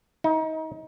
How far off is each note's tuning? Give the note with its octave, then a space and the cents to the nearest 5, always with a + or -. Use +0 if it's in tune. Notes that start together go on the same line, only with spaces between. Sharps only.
D#4 +30